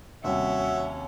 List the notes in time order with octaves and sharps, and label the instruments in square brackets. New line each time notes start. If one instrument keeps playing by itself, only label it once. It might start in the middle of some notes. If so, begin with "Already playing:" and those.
[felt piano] D#2 C3 G3 [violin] C#4 [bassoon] F#4 [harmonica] E5